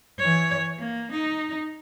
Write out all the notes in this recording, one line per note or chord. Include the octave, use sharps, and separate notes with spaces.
E3 C#5
A#3
D#4